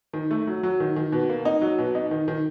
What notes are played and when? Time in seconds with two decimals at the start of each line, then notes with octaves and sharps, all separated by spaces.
0.13 D#3
0.31 A3
0.47 F#3
0.63 F#3
0.80 D#3
0.96 D#3
1.12 B2
1.29 A#3
1.45 D#4
1.62 F#3
1.79 B2
1.95 D#4
2.11 D#3
2.28 D#3